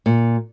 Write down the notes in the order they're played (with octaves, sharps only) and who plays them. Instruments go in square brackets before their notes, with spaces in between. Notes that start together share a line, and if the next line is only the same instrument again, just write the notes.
[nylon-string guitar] A#2